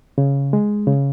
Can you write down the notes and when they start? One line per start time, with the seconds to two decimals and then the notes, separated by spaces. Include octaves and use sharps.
0.18 C#3
0.53 G#3
0.87 C#3